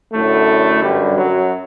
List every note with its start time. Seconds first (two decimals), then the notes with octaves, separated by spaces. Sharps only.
0.13 F#2 A2 D3 A3
0.83 G2 G3
1.18 F#2 F#3